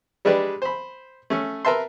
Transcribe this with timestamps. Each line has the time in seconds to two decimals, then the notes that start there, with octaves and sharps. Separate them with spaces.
0.25 G3 G#3 D4 G4 B4 D5
0.62 C5 B5
1.30 A3 C#4
1.65 A#4 B4 E5 A5 C6